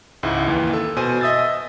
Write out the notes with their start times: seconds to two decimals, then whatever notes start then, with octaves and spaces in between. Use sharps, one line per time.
0.23 C#2 G#2 E4
0.47 D#2 E3
0.73 A4
0.96 B2 C5 G#5 D#7
1.21 D#5 E5 D#6 E6 A6